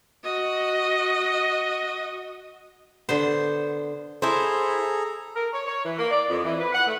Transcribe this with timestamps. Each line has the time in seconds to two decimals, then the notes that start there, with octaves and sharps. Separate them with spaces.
0.24 F#4 D#5
3.09 D3 B3 C5
4.22 E4 G#4 A4 C5 A#5
5.36 A#4
5.53 C#5
5.67 C#5
5.85 E3
5.98 A#3
6.11 D5
6.29 F2
6.45 E3
6.59 B4
6.73 F#5
6.86 A3